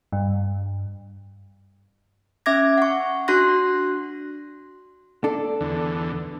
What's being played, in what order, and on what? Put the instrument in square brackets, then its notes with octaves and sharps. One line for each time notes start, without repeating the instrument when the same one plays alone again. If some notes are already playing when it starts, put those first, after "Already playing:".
[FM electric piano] G2
[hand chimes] C#4 E5 D6 G#6 A#6
F#5 C#6
D4 F#4 C6 F#6 A#6
[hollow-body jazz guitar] D4 A4
[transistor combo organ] E2 D3